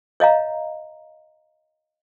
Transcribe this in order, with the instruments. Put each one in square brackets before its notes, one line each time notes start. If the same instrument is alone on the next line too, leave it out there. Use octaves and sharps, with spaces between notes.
[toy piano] C#5 D#5 F5 A#5